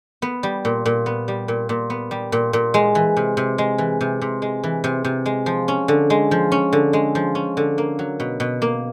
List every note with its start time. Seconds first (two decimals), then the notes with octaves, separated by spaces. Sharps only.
0.22 B3
0.43 G3
0.65 A#2
0.86 A#2
1.06 B3
1.28 G3
1.48 A#2
1.69 A#2
1.90 B3
2.11 G3
2.32 A#2
2.53 A#2
2.74 G#3
2.95 E3
3.17 C3
3.37 C3
3.58 G#3
3.78 E3
4.01 C3
4.21 C3
4.42 G#3
4.64 E3
4.84 C3
5.04 C3
5.26 G#3
5.46 F3
5.68 C#4
5.88 D3
6.10 G#3
6.31 F3
6.52 C#4
6.73 D3
6.93 G#3
7.15 F3
7.35 C#4
7.57 D3
7.78 A#3
7.99 F#3
8.20 B2
8.40 B2
8.62 A#3